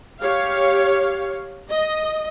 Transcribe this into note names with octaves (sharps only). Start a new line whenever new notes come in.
G4 C#5 F5
D#5